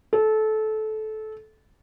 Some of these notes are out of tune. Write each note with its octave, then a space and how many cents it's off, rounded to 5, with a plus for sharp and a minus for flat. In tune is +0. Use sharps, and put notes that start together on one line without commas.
A4 -20